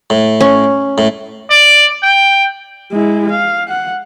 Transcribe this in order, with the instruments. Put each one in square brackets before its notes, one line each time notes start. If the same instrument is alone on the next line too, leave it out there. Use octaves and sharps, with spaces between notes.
[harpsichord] A2
[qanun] C#4
[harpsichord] A2
[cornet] D5
G5
[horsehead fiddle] G#3 E4
F5
F#5